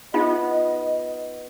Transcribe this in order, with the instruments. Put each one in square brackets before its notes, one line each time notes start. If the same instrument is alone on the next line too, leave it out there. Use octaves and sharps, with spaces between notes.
[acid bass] B3 [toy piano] D#4 F4 E5 [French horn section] D#5